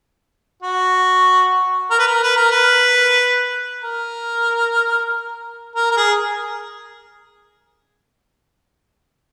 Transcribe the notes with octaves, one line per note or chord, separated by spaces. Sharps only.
F#4
A#4
B4
A#4
B4
A#4
B4
A#4
A#4
A#4
G#4